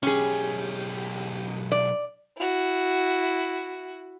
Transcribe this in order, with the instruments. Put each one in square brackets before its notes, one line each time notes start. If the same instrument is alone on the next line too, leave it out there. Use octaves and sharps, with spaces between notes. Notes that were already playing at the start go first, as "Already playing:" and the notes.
[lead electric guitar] B1 G4 [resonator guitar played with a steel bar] C#4 G#4
[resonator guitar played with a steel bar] D5
[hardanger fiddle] E4 F#4